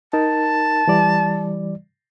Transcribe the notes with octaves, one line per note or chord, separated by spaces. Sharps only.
D#4 A#4 A5
E3 G3 D5